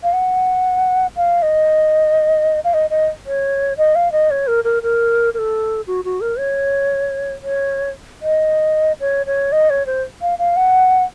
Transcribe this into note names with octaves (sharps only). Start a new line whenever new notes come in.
F5
F#5
F5
D#5
F5
D#5
D#5
C#5
D#5
F5
D#5
C#5
A#4
A#4
A#4
A#4
A4
F#4
F#4
A#4
C#5
C#5
D#5
C#5
C#5
D#5
C#5
C5
F5
F5
F#5